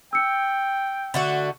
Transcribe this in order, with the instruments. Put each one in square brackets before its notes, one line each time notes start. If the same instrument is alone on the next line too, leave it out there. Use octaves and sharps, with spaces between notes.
[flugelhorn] G5 [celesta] E6 C#7
[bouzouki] D3 A3 F#4